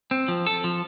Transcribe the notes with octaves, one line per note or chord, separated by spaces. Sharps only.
C4
F3
A4
F3